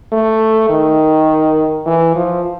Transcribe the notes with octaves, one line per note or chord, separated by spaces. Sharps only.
A3
D#3
E3
F3